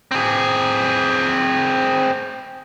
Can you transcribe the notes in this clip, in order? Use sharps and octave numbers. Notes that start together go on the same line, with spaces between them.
C4 G#4